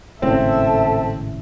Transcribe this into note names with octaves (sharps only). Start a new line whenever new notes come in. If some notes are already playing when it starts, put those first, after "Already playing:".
G#1 A2 C#3 C4 A4 E5